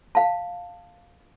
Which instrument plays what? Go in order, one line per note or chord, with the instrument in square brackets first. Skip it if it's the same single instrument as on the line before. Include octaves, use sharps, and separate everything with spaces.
[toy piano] F5 A5